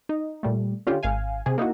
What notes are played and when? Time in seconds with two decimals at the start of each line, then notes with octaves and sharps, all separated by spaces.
0.09 D#4
0.43 A#2 G3 A3
0.87 D3 C#4 F4 G4
1.03 G#1 F5 G#5
1.46 C3 G#4
1.58 A#3 D#4 E4 F#4